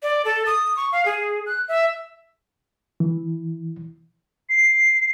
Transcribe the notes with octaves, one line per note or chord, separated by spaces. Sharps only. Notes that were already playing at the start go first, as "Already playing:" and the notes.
D5
A4
D#6
C#6
F5
G#4
F#6
E5
E3
C7